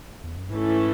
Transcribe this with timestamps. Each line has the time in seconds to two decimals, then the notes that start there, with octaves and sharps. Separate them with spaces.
0.23 E2
0.37 F#2
0.50 G#2 E3 A3 C#4 E4 A4